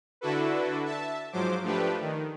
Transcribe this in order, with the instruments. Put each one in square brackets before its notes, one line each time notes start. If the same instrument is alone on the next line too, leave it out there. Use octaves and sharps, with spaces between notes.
[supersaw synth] D3 D4 E4 F#4 A4 B4
E5 A5
G#2 F3 F#3 C5 D6
F3 A3 D4 G4 B4
D#3